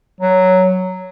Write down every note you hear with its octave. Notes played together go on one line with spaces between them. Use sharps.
F#3